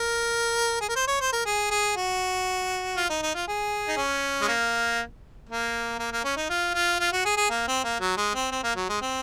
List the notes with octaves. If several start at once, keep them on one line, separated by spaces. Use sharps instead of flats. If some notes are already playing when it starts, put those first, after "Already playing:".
Already playing: A#4
G#4
A#4
C5
C#5
C5
A#4
G#4
G#4
F#4
F4
D#4
D#4
F4
G#4
D#4
C#4
G#3
A#3
A#3
A#3
A#3
C#4
D#4
F4
F4
F4
F#4
G#4
G#4
A#3
C4
A#3
F#3
G#3
C4
C4
A#3
F#3
G#3
C4